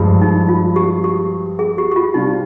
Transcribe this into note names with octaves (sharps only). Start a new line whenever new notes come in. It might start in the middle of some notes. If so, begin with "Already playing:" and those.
Already playing: G2 F3 G#3
D#4
F4
G4
G4
G#4
G4
G4
F4
C3 G3 D4 D#4 F4